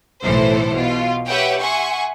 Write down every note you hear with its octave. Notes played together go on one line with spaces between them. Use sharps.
B1 A2 E3 A4 C5
B2 F4
G4 B4 C#5 E5 F#5 G5
E5 F#5 G#5 C6 C#6